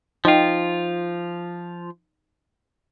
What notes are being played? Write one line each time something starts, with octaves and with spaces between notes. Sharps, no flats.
F3 D#4 F4 D#5 G5